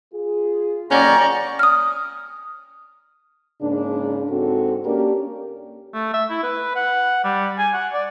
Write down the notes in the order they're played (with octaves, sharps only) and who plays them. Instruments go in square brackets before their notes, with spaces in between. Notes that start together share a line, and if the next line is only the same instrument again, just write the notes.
[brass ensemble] F4 G#4
[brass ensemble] B1 A#2 [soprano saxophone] C#4 [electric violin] D5 C#6 [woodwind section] F#5 G5 A#5
[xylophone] D#6 F6
[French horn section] G#2 C#3 A#3 D4
G#2 C4 F#4 A4
A#3 C#4 D4 G4 A#4
[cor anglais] A3
E5
E4
B4
F#5
G3
G#5
F#5
D5